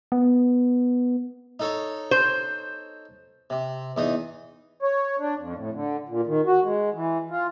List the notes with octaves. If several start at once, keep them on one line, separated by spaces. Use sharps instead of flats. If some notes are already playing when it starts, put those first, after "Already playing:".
B3
D#4 A4 C#5
C5
C3
E2 D#4 D#6
C#5
D4
F2
A2
D3
A#2
D#3
F#4
G#3
E3
F4